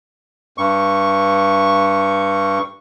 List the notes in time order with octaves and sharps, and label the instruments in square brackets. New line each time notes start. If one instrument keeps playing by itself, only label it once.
[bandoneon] G2 C#6